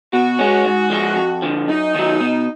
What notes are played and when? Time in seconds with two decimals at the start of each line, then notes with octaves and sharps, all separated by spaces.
0.13 B2 F#4
0.39 G#3 C#4
0.65 G#2
0.90 F3 G#3
1.16 F2
1.42 D3 F3
1.68 F#2 D#4
1.95 D#3 F#3
2.21 B2